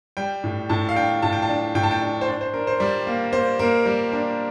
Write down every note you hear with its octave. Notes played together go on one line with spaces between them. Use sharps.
G3 G5
A2
A2 A5
F5
D4 G5
A2 A5
G5
A5
D4
A2 G5
A5
G5
D4
C5
D4 D5
C5
D4 A#4
C5
G3 D5
A#3
A#3 C5
A#3 A#4
G3
D4